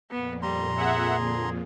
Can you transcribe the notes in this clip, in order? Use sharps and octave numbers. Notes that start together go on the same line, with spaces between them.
F2 A#2 B3
G3 A#5 C6
G#4 E5 F#5
D3